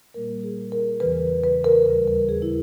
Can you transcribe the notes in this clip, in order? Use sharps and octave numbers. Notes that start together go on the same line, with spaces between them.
A#2 G3 A#3 A#4
G#4
A#4
E2 C#3 E3 B4
B4
A#4
D#2 C#3 G3 A#4
A#4
G#4
E4